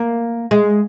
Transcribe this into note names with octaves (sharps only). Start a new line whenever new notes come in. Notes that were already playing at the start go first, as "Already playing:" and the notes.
Already playing: A#3
G#3